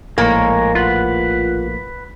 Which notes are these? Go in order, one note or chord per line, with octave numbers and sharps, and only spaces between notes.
A#1 A2 G#3 A#3 A#4 C#5
F4 B4 F#5